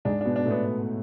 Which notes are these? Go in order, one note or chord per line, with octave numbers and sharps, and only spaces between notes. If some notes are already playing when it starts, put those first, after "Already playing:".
G#2 G#3 D4
B2 B3 D4
D4
A2 A3
B3